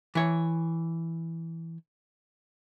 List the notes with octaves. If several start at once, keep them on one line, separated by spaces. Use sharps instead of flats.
E3 C#5